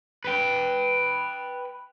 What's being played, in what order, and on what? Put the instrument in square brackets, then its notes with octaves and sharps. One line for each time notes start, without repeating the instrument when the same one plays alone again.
[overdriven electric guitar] B4 G5